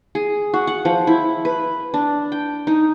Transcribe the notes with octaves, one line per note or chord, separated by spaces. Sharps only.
G#4
F#4
F#5
F3
E4
B4
D4
G5
D#4